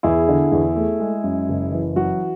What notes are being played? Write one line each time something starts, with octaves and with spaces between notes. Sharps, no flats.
E2 E4 G#4
D3
E2
A3
G#3
F#2
F#1
E3
F#3 F#4